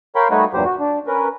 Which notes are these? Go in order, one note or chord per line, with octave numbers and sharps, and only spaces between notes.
A#4 C#5 F5 G5 B5 C6
G3 A3 D#4 F#4 B4 C#5
E2 G2 A#2 F#3 G4 C5
F#4
D4
C#4 A#4 B4